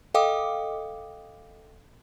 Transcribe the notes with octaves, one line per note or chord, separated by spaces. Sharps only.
A4 D#5 F5 G5 D6 D#6